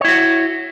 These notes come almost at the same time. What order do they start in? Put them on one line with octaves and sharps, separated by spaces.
C#5 E4 F#4